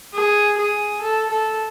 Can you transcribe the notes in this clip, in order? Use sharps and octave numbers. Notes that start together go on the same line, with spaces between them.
G#4
G#4
A4
A4